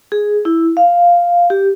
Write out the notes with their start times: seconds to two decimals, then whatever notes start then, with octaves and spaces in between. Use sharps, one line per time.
0.12 G#4
0.45 E4
0.77 F5
1.50 G4